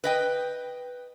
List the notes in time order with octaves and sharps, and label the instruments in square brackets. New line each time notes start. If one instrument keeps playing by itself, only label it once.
[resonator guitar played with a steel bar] B4 D#5 G5